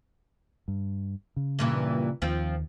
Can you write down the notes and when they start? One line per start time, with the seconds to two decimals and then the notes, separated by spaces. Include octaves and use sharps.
0.68 G2
1.36 C#3
1.59 G2 A#2 E3
2.22 D#2 F3 C4